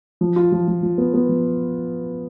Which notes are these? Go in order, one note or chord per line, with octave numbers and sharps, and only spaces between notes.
F3
F4
F3
F3
F3
B3
B3
F3